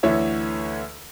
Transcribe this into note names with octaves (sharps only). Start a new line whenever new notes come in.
D2 D3 E3 C#5 E5